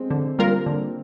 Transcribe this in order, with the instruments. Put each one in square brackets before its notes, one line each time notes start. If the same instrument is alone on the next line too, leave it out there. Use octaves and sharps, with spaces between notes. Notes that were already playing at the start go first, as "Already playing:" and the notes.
Already playing: [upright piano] G#3 C4
[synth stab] D3
G3 A#3 F4 A#4
D3